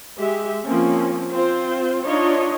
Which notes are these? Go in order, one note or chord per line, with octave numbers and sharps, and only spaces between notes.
G#3 G4 E5
F3 A#3 C4 C#4
C4 F4 C5
D4 D#4 F4 C#5 D#5